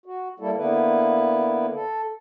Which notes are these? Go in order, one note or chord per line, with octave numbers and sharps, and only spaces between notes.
F#4
G3 A#3 E4 A4
D3 A#3 B3 E4 B4
A4